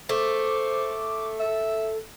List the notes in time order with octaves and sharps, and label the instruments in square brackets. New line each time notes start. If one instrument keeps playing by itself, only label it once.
[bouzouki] A3 [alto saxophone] C5 [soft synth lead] D6
[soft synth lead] A4 [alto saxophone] E5